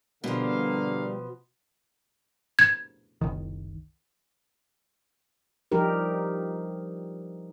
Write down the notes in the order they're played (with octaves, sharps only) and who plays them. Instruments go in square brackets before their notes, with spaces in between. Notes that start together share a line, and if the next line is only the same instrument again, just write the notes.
[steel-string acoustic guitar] B2 F3 [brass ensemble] D3 A#3 F5 [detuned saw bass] G3
[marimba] G#6
[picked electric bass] F#1 C2 D#3
[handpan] F3 G3 D#4 G4 A#4